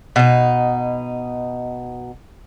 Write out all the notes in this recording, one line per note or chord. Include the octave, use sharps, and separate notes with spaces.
B2 D#4